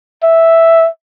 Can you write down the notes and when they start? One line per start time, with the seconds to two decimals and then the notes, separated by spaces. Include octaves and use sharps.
0.23 E5